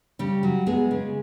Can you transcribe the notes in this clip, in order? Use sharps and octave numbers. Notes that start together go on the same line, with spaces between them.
C#3 G3 G4
F#3
G#3 B3 G#4
C#3